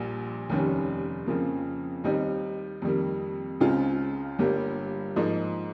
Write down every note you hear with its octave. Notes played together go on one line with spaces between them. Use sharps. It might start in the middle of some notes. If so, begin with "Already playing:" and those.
Already playing: A#1 A#2 G3
F1 D#2 D#3 G3 C#4
F2 C#3 F3 A#3
D#2 D#3 G3 C4 D#4
F2 D#3 G3 A#3
C#2 C#3 G#3 C4 F4
G1 G2 G3 A#3
G#2 F3 A#3 D#4